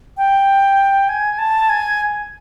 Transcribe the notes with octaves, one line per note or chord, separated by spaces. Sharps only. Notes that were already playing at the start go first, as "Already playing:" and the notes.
G5
G#5
A5
G#5